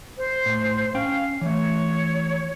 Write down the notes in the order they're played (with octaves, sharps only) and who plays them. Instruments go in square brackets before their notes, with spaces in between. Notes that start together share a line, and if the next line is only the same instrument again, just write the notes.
[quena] C5
[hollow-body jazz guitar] A2
[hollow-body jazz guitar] C#4 G5 [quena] F5
[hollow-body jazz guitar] E3 A3 [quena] C#5